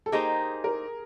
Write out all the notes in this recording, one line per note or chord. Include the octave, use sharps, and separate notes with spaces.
A4
A#3 D#4 G4 G#4 C5
A#4